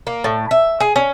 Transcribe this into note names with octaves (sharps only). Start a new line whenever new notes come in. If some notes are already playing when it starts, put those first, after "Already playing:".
A#3
A2
E5
G#4
C#4